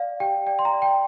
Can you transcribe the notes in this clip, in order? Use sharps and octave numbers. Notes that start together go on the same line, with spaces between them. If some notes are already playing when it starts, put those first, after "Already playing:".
Already playing: D5 F5
G4 G5
D5 G5
C6
A#5
D5
G5